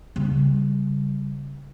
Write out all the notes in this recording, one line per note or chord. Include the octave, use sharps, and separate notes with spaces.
C#3 G3